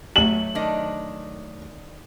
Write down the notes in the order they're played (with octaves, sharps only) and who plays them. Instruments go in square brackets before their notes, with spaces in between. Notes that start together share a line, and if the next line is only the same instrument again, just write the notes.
[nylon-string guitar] F#3 A3 E5 [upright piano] F#7
[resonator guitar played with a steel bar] D#3 D4 D#5